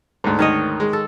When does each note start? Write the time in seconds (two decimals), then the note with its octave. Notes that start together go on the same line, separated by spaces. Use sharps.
0.24 D2 G#2
0.39 D#3 C#5 D#5
0.80 G#3
0.93 A4